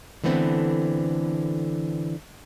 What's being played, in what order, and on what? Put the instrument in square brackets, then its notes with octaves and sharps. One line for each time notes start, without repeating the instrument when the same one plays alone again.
[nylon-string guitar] D3 E3 A3 B3 C4